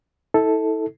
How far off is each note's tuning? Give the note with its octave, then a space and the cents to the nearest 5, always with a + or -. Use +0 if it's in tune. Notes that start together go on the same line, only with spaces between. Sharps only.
E4 -40 A4 +0